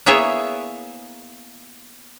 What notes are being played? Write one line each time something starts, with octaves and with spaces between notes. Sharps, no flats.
A#3 B3 E4 G#4 C#5 E5